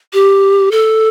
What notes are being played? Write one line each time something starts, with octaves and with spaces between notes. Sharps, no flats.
G4
A4